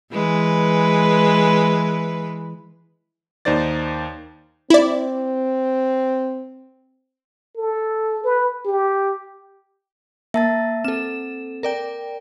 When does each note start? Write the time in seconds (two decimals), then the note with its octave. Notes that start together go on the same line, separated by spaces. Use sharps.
0.11 E3 G#3 B4
3.45 D#2 D#4 C5 D5 A6
4.70 C4 E4 D5
7.56 A4
8.24 B4
8.65 G4
10.34 A#3 E5 A5 A6
10.84 C4 A4 E7
11.63 A#4 D5 G5